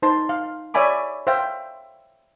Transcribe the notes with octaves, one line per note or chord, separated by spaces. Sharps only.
D#4 C5 A5 C6
F5
C#5 D5 E5 G#5 B5 D6
C5 E5 F5 G5